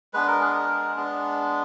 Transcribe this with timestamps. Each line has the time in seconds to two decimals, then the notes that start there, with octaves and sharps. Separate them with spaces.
0.14 G#3 B3 D4 B4
0.27 A#4
0.40 G#4
0.54 A#4
0.96 G#3 B3 D4